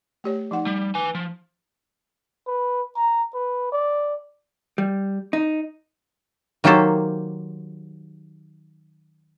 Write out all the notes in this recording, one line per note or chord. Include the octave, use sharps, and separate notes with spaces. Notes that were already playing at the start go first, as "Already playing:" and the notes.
A3 G4 C#5
F3 D#4 F#5
G3
B4 G#5
F3
B4
A#5
B4
D5
G3
D#4
D#3 F#3 A#3 G4 A4 C5